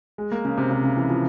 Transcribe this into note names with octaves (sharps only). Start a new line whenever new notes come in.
G#3
A#3
C#3
C3
C3
C#3
E3
F3